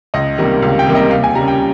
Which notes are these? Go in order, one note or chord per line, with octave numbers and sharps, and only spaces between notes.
C#2 D#5
C3 D#3 G3 A#3
C#2 F5
G5
C3 D#3 G3 A#3
D#5
D#2 F5
G#5
C#3 G3 A#5
G5